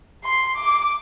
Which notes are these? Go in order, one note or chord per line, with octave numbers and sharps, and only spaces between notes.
C6
D6